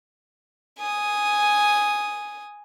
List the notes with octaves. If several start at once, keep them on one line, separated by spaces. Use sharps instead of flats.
G#5 D#6